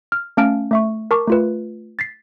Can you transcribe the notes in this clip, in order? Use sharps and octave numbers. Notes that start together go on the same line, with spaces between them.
F6
A3 C#4 F5 A5 F6 D7
A3 E5 C#6
A#4 A5 C#6 D6
A3 F4 B4
A6 B6 C7